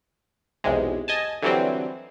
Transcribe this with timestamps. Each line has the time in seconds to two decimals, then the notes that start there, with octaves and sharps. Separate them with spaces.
0.64 B1 E2 C3 G#3
1.08 D#5 G#5 A5
1.42 D3 E3 F#3 G3 C4